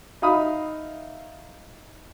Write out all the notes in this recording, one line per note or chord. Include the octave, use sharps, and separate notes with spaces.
D#4 E5 F5 B5 D#6